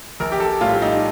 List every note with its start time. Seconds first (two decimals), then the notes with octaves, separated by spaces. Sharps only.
0.20 A#1 A#4
0.32 G4
0.40 A4
0.61 A2 G3 F4
0.82 D#4